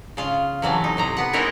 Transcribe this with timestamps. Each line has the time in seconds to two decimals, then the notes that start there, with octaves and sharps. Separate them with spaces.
0.17 C#3 F4 F5
0.62 C3 E3 F#3 A3
0.84 D#4
0.97 A2 C3 A#5
1.17 B3 F#5
1.33 G#3 C4 D#4 E4 A#4 C#5